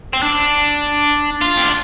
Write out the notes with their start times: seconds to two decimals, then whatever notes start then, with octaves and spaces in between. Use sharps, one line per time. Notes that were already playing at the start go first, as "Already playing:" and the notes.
0.13 C4
0.23 D4
1.42 F4
1.57 C4
1.63 D4